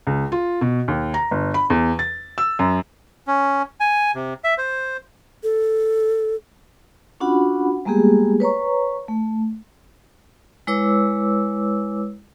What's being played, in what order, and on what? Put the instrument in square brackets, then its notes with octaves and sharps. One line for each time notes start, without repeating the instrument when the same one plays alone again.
[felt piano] C#2
F4
B2
D#2
A#5
G1
B5
E2
A6
E6
F#2
[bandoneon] C#4
G#5
C3
E5
C5
[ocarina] A4
[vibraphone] C#4 D4 F4 F#4 F#5 B5
G3 G#3 A#3 B3 G4 G#4
B4 C#5 A#5 C#6
A3
G#3 E4 B4 C#5 D6 E6